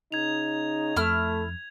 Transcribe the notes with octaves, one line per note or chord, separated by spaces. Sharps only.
C#3 D#4 G#6 F7
F2 A3 E4 F6